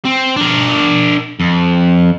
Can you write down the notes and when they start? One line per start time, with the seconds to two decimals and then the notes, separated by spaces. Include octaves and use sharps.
0.05 C4
0.36 D4 A#4
1.40 F2